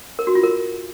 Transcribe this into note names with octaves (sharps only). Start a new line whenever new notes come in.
A#4
F#4
F4
A#4